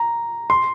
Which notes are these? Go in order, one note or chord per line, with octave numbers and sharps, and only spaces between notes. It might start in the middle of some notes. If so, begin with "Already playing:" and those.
Already playing: A#5
C6